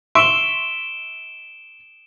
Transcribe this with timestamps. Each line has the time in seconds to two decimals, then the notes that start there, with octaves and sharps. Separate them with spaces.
0.15 E5 C6 C#6 D7 E7 G7